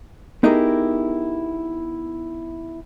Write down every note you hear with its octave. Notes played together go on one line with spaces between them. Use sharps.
B3 D#4 E4 G4 G#4 A#4